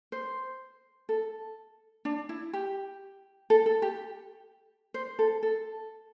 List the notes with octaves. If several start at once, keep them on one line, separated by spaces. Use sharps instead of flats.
C5
A4
D4
E4
G4
A4
A4
G4
C5
A4
A4